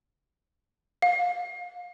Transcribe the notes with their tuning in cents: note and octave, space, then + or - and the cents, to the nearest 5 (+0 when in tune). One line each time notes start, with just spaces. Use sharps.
F5 +30